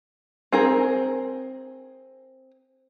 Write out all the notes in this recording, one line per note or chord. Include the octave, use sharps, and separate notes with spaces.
C4 G#4 A#4